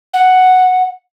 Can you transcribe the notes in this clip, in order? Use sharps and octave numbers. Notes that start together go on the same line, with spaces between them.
F#5